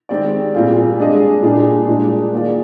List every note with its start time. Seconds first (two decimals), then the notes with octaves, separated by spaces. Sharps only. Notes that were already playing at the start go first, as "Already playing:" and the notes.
0.09 D#3 G#3 C4 G4 D5
0.54 A#2 G3 C4 F4 G#4
0.99 G#3 D4 G#4 D#5
1.43 A#2 G3 A#3 D4 G#4
1.88 A#2 G#3 D4
2.33 D#3 A#3 F4 G#4 D5